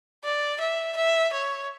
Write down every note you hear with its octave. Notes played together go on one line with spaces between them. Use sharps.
D5
E5
E5
C#5